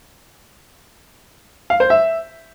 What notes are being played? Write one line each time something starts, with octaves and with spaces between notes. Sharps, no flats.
F5
C5
E5